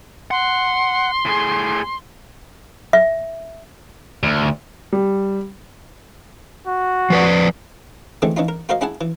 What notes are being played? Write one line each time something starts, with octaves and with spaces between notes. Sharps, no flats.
F#5 C6
A2 G#4
E5
D2
G3
F#4
F3 B4 D5
D3 E3 G#3 A3 C4 C#4
E3 C#4 D#4 F4
A#4
F4 F#4 A#4 C5 D#5 F5
C#4 E4 G#4 F#5 G#5 A5
E3